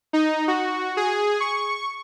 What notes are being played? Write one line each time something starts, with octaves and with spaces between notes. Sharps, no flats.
D#4
F#4
G#4
C#6